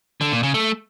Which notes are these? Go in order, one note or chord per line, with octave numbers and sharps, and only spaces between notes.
D3
A#2
C#3
A3